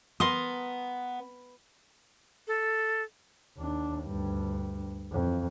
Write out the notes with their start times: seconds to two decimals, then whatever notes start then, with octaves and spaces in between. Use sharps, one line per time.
0.20 B3 A#4 C6 D#6
2.47 A4
3.58 D#2 D4
4.04 D2 G2
5.13 F2 E3